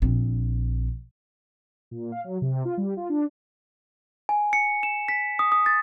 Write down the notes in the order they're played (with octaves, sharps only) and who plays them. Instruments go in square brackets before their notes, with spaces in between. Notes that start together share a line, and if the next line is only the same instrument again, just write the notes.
[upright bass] A#1 C4
[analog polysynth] A#2
F5
F#3
C3
F4
G3
F4
D4
[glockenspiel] G#5
C#7
E7
B6
D#6
D#6
A6